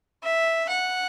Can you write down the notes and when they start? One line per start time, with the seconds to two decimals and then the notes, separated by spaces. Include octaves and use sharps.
0.23 E5
0.69 F#5